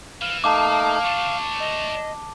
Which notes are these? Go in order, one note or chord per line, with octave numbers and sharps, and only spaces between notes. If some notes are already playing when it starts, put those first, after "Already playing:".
E3 F5
A3 A#3 D#4 F5 A5 D6
A3 D4 C#6
D#5